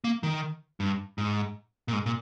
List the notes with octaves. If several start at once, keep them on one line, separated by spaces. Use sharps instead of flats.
A#3
D#3
G2
G#2
A#2
G#2
A#2